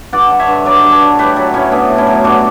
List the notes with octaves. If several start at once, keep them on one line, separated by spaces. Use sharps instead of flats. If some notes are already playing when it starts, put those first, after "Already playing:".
G2 D5 F#5
D3
C#5 E5
G2
F#3 B4 D5
G2
A4 C#5
D3
A2 G4 B4
F#3 F#4 A4
A2 C#4 E4
A3 B3 D4
A2
C#4 E4
F#3
G2 D4 F#4